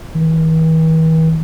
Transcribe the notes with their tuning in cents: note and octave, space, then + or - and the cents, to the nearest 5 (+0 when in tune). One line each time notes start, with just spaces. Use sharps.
E3 -45